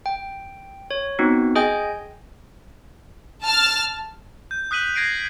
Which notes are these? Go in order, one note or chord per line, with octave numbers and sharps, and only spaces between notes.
G5
C#5
B3 C4 D#4 F#4
G#4 D#5 G5 G#5 G6
A5 F6
G6
D#6 F#6 B6 D#7 F#7
G#6 A#6 C7 D7 D#7